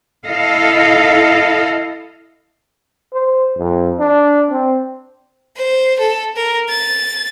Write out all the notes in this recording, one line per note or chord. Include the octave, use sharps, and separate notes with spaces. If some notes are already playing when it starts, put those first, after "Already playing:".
E4 A4 D#5 F5
C5
F2
D4
C4
C5
A4
A#4
A6